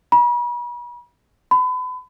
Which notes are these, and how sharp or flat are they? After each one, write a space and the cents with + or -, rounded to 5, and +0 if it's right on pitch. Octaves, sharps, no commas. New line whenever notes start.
B5 -40
B5 +35